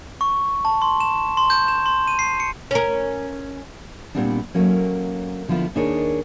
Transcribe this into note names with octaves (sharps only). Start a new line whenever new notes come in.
C#6
A5
C6
E7
C6
G6
E7
C6
D#7
C7
C#7
C#4 A#4
A#2 F#3 G3 B3 C4 D4
F#3 A3 A#3 C#4
D3 F3 B3 E4 F4
D#2 D4 D#4 G#4 A#4 C#5